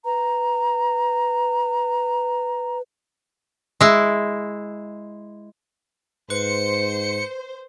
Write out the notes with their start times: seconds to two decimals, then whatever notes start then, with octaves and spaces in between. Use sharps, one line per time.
0.05 B4 A#5
3.81 G#3 E4
6.30 G#2 B4 C5 C#7